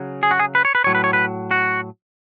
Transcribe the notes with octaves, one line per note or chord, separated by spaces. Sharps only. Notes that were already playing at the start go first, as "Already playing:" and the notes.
Already playing: C#3 F#3
G#4
F#4
G#4
B4
C#5
B4
A2 F#3 C#5
B4
C#5
B4
F#4